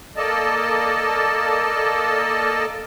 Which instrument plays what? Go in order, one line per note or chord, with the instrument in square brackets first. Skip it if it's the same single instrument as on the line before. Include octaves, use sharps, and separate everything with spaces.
[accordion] A#3 A4 D5 D#5 A5